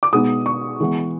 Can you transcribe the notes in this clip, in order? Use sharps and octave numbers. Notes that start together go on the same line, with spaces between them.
D6
B2 G#3 B3 D#4 D#6
C#6
E3 G#3 B3